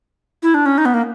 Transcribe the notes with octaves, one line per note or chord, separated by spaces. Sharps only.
E4
D4
C#4
D#4
B3
A#3